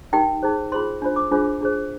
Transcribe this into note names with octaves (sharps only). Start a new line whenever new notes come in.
D#4 G4 A#4 G5
D#4 G#4 C5
F4 G#4 C5 C6
D4 F4 C5
D6
D4 F4 G#4 C5
D4 G#4 C5